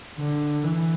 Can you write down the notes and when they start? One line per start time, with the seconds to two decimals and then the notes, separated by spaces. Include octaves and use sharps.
0.18 D3
0.64 E3